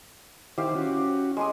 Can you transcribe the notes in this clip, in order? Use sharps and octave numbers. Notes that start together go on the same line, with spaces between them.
D#3 E4 G4 C5 F5
C#4 F#4
G#3 G#4 C6 D#6